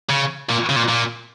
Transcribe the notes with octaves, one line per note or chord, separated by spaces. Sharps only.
C#3
A#2
C#3
A#2
A#2